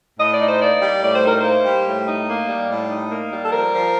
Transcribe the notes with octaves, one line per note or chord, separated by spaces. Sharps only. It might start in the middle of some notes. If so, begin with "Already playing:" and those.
A2 D#5
D5
D#4
C5
A#3 D5
G3
A2 D5
C5
D#4 A#4
A#3 C5
G3
A2
D#4
A#3
G3
A2
D#4
A#3
G3
A4
F3 A#4
F3